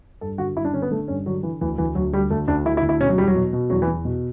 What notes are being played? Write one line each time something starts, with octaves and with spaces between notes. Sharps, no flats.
G2 A4
D3 F#4
G2 E4
D4
D3 C#4
B3
D3 A3
G2 C#4
D3 F#3
D3 E3
D2 E3
D2 E3
D2 F#3
D3 G3
D2 A3
D2 D4
D3 E4
E4
D2
E4
B2 C#4
F#3
E2 G3
F#3
B2
B2
E2 F#3
E3
E2
B2